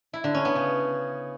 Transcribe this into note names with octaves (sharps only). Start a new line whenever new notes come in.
E4
D3
C#4
B3
C#3